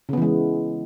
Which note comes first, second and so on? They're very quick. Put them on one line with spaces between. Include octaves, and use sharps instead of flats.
C#3 B3 E3 G#3